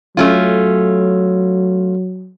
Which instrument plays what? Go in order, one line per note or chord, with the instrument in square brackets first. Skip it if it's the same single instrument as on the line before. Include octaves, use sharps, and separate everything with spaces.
[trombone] F#3 [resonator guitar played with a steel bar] A3 C#4 F4